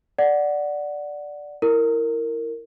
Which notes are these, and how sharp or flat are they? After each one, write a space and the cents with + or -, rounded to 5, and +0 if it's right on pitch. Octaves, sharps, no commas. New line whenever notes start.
D5 +0 F#5 +0
E4 +0 A#4 -15